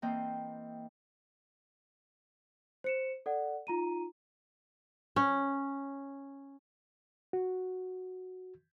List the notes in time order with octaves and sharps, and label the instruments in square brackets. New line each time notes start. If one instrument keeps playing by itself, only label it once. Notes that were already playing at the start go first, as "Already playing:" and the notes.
[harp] E3 A#3 C4 D#5 G5
[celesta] C5 C#7 E7
A4 D5 F#5
D#4 F4 A#5 D#7
[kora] C#4
[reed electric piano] F#4